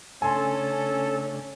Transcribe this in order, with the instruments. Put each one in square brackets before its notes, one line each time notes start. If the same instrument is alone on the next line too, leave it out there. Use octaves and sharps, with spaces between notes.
[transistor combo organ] C#3 A3 D4 [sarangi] C#4 [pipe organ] A4 [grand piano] G#5 C6